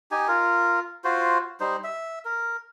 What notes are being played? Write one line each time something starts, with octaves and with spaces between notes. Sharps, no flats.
D#4 G4 G#5
F4 A#4
F4 F#4 C5
G3 D#4 C5
E5
A#4